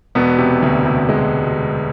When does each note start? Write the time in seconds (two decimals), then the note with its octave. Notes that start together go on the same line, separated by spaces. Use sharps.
0.15 E1 B2 B3
0.38 C3
0.62 D2
0.86 C3
1.09 G#3